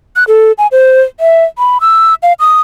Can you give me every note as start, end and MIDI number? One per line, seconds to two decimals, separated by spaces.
0.16 0.24 90
0.28 0.52 69
0.58 0.67 80
0.72 1.01 72
1.20 1.44 76
1.58 1.78 83
1.81 2.14 88
2.23 2.33 77
2.40 2.61 87